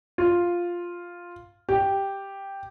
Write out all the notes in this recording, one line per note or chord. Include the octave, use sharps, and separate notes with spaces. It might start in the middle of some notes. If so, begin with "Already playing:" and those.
F4
G4